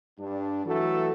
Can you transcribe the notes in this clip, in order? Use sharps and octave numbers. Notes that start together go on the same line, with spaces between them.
G2 D4
E3 F#3 A3 F#4 A4